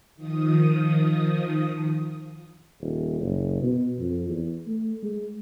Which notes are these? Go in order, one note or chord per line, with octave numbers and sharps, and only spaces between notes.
D#3 F3 D#6
D#1
F#1
B2
F2
E2
A3
G#3